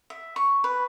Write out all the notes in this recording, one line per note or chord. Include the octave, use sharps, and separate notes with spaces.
E5
C#6
B4